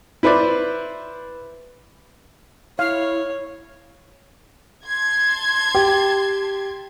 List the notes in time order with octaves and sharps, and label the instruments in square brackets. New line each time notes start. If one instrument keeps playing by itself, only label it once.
[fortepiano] E4 B4 C5 D5
[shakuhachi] E4 [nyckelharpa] C#5 [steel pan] F5
[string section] A5 C6 G#6
[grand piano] G4